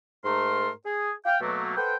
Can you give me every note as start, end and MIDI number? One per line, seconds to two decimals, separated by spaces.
0.24 0.70 44
0.24 0.70 57
0.24 0.70 70
0.24 0.70 84
0.85 1.12 68
1.25 1.37 77
1.25 1.37 79
1.41 1.72 47
1.41 1.72 54
1.41 1.72 57
1.41 1.72 58
1.77 1.95 69
1.77 1.95 71
1.77 1.95 72
1.77 1.95 78
1.77 1.95 79